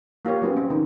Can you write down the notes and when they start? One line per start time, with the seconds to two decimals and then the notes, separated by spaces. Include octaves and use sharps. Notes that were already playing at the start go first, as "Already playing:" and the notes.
0.25 A#3 F4 G4 C#5
0.42 F#3 B3 C#4
0.57 C4
0.70 D#3